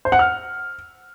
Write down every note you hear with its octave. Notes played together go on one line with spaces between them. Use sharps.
C5
F#5
F6